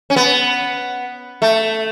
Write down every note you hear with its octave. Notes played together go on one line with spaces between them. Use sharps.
C#4
B3
A3